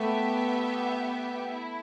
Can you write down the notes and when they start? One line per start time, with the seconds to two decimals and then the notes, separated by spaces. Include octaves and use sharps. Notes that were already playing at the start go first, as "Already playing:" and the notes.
Already playing: A3 B3 G4 E5
1.51 E4